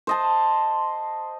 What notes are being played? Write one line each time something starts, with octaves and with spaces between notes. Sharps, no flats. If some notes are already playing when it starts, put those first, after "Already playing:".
C5 D#5 A5